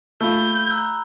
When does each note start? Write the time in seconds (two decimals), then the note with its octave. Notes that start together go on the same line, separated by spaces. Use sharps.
0.21 A3 F4 B5 E6 G6
0.70 A#5 E6 F#6